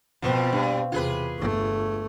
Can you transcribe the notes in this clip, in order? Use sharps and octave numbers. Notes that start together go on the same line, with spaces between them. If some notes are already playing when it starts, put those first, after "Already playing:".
F2 B2 F3 C4
G2
E2 C3 F4 G#4 B4
G1 A3